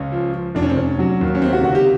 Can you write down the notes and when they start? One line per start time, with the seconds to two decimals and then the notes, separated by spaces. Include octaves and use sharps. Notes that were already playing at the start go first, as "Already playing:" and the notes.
Already playing: C#2 C#4
0.12 F3
0.34 F3
0.55 F1 D4
0.62 C#4
0.70 C4
0.76 F1 C#4
0.99 F#3
1.21 D#2
1.35 C#4
1.42 C3 C4
1.53 F#4
1.63 C#2 F#4
1.75 G4